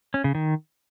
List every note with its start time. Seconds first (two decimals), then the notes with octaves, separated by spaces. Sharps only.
0.14 C#4
0.24 C#3
0.35 D#3